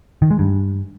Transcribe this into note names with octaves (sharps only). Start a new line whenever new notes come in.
D#3
G#3
G2